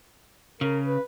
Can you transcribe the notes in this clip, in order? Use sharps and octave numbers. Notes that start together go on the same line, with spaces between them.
C#3 A#4
B4